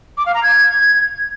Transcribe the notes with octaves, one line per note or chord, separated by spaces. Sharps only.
D6
F5
A#5
G#6